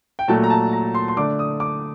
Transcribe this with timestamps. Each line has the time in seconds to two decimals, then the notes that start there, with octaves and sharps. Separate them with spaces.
0.19 G5
0.28 A#2 F#3 A3 A5
0.43 A#5
0.50 A5
0.73 A#5
0.94 C6
1.08 C6
1.17 D3 A3 D4 D6
1.39 D#6
1.60 D6